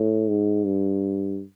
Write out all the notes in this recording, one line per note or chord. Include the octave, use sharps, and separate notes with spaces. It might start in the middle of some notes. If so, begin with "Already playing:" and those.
Already playing: A2
G#2
G2